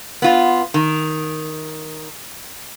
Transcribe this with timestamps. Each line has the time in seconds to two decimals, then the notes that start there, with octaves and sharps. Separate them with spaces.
0.22 B3 F4
0.74 D#3